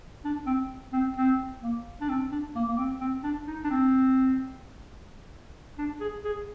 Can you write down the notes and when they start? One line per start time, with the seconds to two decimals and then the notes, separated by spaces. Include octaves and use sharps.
0.25 D4
0.47 C4
0.93 C4
1.17 C4
1.62 A#3
2.01 D4
2.09 C4
2.32 D4
2.55 A#3
2.68 A#3
2.77 C4
3.01 C4
3.23 D4
3.47 D#4
3.64 D4
3.70 C4
5.78 D4
6.00 G#4
6.24 G#4